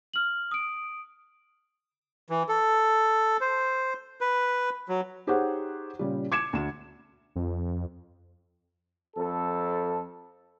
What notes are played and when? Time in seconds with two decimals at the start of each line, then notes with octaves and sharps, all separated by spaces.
0.14 F6 F#7
0.51 D#6 D7
2.30 E3
2.49 A4
3.41 C5
4.21 B4
4.89 F#3
5.27 D#4 G4 G#4 C5 C#5 F#5
5.99 A#2 C#3 G3
6.32 D6 G#6 C#7 E7
6.53 D2 E7
7.36 F2
9.16 F2 A4